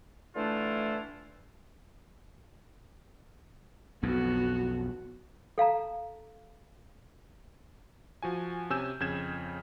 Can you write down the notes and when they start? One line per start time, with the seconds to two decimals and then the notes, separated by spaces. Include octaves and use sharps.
0.36 D3 E3 A3 D4 E4 F4
4.03 B1 F2 B3 F#4
5.58 A4 F5 A5 A#5
8.22 F3 F#4 G#5
8.70 C3 C#4 G#5 E6 G6 E7
9.00 F2 C#3 G6 G#6 E7